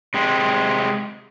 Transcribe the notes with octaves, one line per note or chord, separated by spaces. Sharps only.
C3 G#3 C4